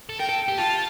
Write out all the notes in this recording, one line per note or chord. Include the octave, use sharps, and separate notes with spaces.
A4
A#4 G5
A4
G4
F4 A5